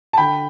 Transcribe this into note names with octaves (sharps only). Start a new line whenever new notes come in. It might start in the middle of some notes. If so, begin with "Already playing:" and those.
A5
D3 G5 B5